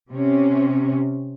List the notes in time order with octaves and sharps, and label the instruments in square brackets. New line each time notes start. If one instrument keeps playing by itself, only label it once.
[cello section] C3 C#4